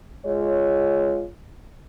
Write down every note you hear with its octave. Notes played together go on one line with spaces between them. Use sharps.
G#3 F4 C#5